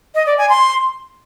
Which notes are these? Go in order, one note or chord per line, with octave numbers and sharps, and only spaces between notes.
D#5
D5
G#5
C6